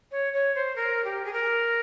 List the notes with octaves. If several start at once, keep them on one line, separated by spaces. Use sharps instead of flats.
C#5
C#5
C5
A#4
G4
G#4
A#4